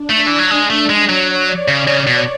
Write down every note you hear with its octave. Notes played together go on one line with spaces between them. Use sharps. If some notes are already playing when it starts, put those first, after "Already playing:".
Already playing: D4
A3
E3
F#3
G#3
A3
G#3
F#3 C#5
D5
C#3 C#5
C#3
B2